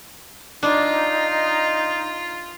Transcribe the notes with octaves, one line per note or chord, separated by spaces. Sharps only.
D4 D#4 F4